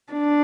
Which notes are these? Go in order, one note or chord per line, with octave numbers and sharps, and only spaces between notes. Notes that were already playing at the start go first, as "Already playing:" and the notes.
D4